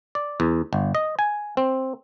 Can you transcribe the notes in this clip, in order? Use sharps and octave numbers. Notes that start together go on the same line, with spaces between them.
D5
E2
G1
D#5
G#5
C4